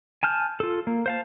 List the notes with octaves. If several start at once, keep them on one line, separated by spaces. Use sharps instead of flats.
G#5 A5 F6 G6
F4 A4
A#3
C5 F5 A5